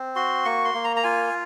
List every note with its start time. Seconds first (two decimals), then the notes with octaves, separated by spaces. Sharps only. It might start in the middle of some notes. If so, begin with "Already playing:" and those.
Already playing: C4
0.16 F#4 C6
0.45 A#3 C#6
0.65 C6
0.74 A#3
0.84 A#5
0.96 A#5
1.04 F4 G#5